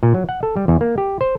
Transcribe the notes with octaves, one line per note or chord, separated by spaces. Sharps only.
A#2
F#3
F#5
A4
G3
E2
A#3
G4
C5